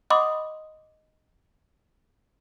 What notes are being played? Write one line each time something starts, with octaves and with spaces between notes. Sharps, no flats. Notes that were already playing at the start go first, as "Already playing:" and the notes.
D#5 F#5 B5 C6 D6 D#6